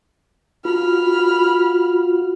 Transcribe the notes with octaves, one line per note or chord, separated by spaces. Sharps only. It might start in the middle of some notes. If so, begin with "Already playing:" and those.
F4 F#4 B5 F6